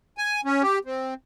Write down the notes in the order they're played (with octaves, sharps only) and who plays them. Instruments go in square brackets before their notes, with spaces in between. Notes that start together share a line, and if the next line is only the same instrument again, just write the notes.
[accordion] G#5
C#4
G4
C4